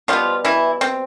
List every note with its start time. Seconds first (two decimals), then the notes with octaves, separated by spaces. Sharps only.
0.08 B2 F3 G3 B3 F4
0.45 E3 E4
0.81 C4